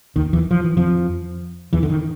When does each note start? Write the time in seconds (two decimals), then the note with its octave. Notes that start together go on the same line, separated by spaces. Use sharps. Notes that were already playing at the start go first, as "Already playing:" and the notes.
0.16 D#2 D#3
0.33 E2 E3
0.51 F3
0.64 E3
0.77 F2 F3
1.73 E2 E3
1.83 D3
1.90 D#3